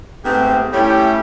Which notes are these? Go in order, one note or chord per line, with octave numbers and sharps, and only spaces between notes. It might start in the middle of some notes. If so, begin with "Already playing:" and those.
G#2 A3 B3 C4 G4
G3 A3 C#4 E4 G4